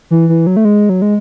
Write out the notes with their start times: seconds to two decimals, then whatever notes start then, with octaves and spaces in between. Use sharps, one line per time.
0.11 E3
0.29 E3
0.47 F#3
0.57 A3
0.65 G#3
0.89 F#3
1.02 G#3